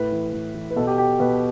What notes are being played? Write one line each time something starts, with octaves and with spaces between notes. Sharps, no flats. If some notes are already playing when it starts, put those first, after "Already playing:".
Already playing: A2 B4
E3
A2
E3
B4
B2 A4
G4
G4
B2 B4